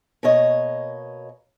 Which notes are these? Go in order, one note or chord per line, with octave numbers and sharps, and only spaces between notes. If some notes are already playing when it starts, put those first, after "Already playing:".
B2 A#3 C#5 D#5